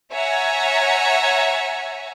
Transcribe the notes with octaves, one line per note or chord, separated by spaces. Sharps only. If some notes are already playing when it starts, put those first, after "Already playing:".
C#5 E5 F#5 G#5 A#5